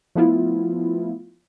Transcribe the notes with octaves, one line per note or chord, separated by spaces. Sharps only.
F3 A3 B3 E4 F4